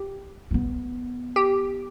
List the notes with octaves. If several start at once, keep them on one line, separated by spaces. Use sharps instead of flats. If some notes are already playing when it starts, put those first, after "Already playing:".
Already playing: G4
A#3
B3
G4